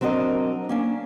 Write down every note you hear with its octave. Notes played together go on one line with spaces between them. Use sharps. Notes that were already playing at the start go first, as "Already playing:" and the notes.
F#3 C4 D4 A#4 D#5
A#3 C#4 D4